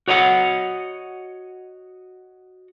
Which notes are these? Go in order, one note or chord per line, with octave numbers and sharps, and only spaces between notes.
F#4 C#5 D#5 F5 F#5